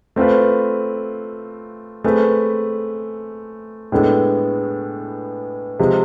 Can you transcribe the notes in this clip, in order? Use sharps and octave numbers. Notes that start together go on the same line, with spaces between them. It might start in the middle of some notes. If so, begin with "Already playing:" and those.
A3 C4 F4 B4
A3 C4 G#4 B4
A2 G#3 B3 D4 A4
C3 F3 G#3